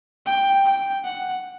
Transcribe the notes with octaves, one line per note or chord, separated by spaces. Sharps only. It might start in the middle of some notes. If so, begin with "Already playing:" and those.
G5
G5
F#5